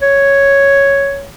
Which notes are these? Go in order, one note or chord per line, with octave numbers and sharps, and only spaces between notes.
C#5